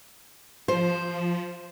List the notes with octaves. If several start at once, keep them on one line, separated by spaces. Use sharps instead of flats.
F3 C5